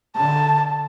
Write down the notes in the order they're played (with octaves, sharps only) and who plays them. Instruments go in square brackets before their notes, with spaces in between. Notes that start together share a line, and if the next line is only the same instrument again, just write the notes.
[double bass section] D3 [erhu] A5